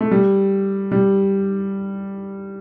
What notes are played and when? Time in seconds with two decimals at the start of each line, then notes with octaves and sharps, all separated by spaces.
0.01 A3
0.11 G3
0.92 G3